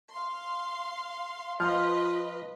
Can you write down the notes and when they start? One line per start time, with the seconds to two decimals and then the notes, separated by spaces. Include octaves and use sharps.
0.11 F5 C6
1.60 F3 F4 B4 D#5 F5 C6 F6